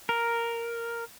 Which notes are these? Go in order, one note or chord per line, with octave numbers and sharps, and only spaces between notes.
A#4